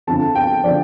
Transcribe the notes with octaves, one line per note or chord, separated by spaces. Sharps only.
F2 D3 F3 A5
G5
D3 F3 D5